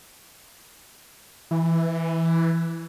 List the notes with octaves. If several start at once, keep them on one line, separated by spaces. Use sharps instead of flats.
E3